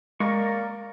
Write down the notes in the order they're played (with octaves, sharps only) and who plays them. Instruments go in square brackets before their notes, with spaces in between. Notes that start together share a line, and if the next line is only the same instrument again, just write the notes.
[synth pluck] G#3 [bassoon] A#3 [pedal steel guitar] A#4 D5 C#6